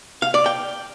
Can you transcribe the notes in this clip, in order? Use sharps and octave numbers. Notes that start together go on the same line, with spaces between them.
F5
D5
G5